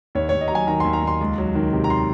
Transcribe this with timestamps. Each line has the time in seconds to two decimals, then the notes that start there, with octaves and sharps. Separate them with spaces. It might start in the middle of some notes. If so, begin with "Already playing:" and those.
0.15 D#2 C#5
0.29 D#2 C#5
0.41 D#5
0.48 A#5
0.51 F#3 G#5
0.67 D#3 A#5
0.80 C6
0.85 D#2
0.93 A#5
1.03 D#2 C6
1.21 C#2
1.38 F#3
1.55 D#3
1.73 C3
1.84 A#5
1.90 C6